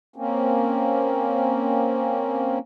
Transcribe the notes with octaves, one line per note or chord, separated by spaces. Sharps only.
A#3 C4 C#4